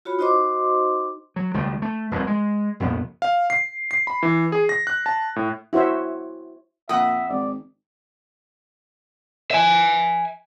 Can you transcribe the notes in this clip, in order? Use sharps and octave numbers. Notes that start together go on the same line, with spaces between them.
F4 F#4 C#5 B5
D#4 F#4 C5 D#5 C6 D6
F#3
C#2 D#3 G3 A3
A3
F1 C2 A2
G#3
C2 F2 A#2 B3
F5
C7
C7
B5
E3
G#4
A#6
F#6
A5
A2
E4 F#4 C5 C#5 E5
F2 A#2 E5 F#5 D#6
G#1 D5
E5 G#5